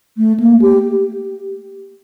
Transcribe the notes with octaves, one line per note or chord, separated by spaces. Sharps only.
A3
A#3
G4